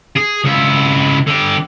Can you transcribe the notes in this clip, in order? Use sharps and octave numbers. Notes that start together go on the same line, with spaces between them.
G#4
C#2 E4
D3 G4